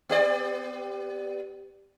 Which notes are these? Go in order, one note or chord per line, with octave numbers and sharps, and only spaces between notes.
B3 G4 D5